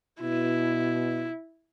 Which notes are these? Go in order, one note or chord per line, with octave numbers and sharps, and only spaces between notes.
B2 E4